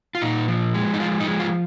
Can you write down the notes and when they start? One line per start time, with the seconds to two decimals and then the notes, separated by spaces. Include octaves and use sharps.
0.15 F4
0.22 A#2 D#4
0.48 F3
0.74 G#3
0.94 D#4
1.00 F3 F4
1.20 D#4
1.27 G#3
1.40 F4